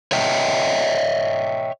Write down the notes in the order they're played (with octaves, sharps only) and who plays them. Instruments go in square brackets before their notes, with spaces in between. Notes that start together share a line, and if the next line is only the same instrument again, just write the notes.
[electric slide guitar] C#5 D#5 E5 G5